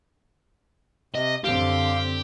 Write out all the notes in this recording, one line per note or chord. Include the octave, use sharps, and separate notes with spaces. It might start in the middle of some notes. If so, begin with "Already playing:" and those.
C3 D#5
F#2 D3 C4 G4 F5